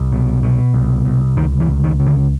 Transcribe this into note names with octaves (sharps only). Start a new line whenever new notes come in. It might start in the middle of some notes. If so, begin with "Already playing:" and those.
Already playing: C2
B2
B2
C2
C2
C#2 D#3
E3
C#2
D#3
C#3
D3